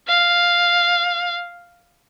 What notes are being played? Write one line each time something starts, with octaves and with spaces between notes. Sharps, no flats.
F5